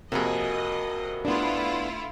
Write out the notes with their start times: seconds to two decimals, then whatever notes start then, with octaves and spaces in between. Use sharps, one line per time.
0.12 F2 C3 A#3 F#4 G#4 D#5
1.25 A3 B3 D4 E4 F4